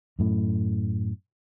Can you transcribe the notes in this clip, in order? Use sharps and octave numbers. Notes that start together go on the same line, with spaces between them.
F#2 A2